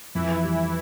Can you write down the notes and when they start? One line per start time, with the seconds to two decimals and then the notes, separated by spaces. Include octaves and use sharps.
0.15 F2 E3 E4
0.44 G3